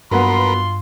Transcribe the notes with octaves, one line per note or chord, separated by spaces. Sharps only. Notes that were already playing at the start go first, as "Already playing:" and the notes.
G2 F#3 A#3 B3 F4 A#4 B4 C6